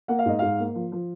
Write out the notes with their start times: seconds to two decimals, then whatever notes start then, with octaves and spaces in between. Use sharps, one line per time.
0.08 A#3 F#5
0.19 F5
0.25 G#2 D#5
0.39 G#2 F5
0.59 A#3
0.75 F3
0.92 F3